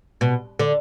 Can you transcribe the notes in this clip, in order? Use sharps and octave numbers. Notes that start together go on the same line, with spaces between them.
B2
D3